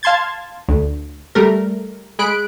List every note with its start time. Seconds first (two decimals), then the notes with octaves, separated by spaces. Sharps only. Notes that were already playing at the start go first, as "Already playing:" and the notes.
0.03 F5 A5 C6 G#6 A6
0.69 D2
1.35 G3 A3 A#4
2.19 G#3 B5 F#6 D7